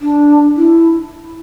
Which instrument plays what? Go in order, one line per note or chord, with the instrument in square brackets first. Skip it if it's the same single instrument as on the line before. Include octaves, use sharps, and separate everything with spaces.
[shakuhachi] D4
E4